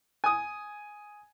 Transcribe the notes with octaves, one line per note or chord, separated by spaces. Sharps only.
G#5 D#6